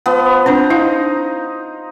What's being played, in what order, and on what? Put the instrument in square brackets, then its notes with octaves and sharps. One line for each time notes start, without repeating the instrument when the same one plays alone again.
[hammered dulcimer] F3 B3
[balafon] C4 D4 [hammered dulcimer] C5 A#5
[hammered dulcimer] D#4 [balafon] E4 F5